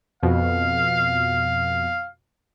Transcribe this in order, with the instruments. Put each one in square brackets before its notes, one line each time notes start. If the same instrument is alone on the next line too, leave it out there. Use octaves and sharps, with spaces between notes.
[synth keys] F2 B2 [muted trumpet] F5